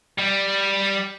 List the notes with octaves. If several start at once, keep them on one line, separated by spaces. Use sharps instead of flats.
G3